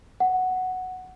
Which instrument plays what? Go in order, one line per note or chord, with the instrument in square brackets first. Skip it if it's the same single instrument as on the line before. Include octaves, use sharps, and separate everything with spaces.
[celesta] F#5